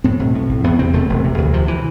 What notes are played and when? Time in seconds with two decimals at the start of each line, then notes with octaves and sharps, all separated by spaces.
0.04 A2 C4
0.19 B1
0.35 A2
0.49 B1
0.64 E2 B3
0.79 C3 C4
0.93 E1 A3
1.09 E1
1.24 C3
1.38 D2
1.53 C3 F3
1.68 E3